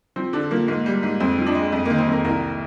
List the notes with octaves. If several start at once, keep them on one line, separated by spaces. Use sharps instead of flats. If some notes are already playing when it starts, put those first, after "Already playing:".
F3 C4
D3 D4
F3 A#3
G#2 A#3
G3
G#2
F2 C4
F3
D4
G#3
F2
D#3 A#3
C4
F2 A#4
C2 A#4